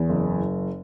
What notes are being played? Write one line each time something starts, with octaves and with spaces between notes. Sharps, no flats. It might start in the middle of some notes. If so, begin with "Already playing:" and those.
Already playing: E2
F#1